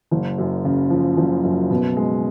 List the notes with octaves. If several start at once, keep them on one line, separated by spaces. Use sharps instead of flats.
F#1
F#2
C#3
F3
F#1
F#2
B2
G#3